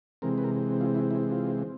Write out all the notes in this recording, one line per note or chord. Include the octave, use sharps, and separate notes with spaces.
C3 E3 G#3 C4 A#4
B4
A#4
F4
E4
E4
F4